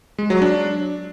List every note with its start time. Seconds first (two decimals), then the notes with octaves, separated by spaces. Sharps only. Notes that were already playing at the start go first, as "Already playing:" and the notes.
0.19 G#3
0.30 F#3
0.42 D4